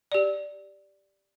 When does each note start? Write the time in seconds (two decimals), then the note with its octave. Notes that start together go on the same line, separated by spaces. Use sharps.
0.12 G4 D5